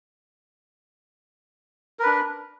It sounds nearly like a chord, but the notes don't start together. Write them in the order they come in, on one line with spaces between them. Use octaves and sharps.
A#4 B4 D4